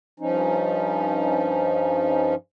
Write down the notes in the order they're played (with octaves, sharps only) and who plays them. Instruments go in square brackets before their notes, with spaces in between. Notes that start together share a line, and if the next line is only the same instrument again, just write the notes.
[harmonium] G2 F3 C#4 D#4